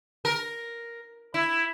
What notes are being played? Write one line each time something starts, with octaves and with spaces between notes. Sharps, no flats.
A#4
E4